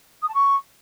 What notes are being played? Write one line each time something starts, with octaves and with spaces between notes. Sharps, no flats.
D#6
A5
C#6